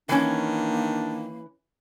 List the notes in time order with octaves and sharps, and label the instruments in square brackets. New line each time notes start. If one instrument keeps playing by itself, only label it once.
[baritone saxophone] D#3 [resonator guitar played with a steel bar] E3 C#4 [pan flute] A#3 [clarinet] D4